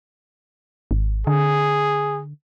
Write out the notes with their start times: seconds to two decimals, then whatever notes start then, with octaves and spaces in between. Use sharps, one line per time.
0.91 G#1
1.27 D3 G#4